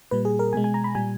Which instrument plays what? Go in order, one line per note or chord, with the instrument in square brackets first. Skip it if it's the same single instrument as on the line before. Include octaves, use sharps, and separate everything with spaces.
[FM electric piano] A#2 G3 B4
G#4
A#4
B2 G#3 G#5
G#5
A#5
B5
A#2 G3 G#5